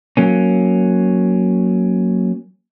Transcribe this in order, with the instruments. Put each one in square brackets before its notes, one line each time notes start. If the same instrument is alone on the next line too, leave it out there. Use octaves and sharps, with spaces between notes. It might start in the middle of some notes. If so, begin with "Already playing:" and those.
[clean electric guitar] F#3 A#3 C#4